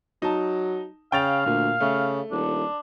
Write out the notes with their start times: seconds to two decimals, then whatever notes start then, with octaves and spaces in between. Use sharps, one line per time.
0.22 F#3 D#4 A5
1.12 C#3 F5 G5 A6 F7
1.46 D2 A#2
1.80 C#3 A3
2.31 D#1 D4